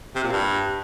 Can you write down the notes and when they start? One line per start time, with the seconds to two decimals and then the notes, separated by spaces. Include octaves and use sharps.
0.15 C3
0.24 A#2
0.32 G2